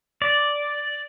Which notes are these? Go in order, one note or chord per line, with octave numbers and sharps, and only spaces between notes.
D5